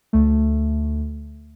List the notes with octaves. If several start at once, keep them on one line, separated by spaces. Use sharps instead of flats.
D2 A3